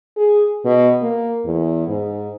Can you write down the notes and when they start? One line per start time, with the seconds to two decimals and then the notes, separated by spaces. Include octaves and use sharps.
0.17 G#4
0.65 B2
1.02 A#3
1.45 E2
1.88 G#2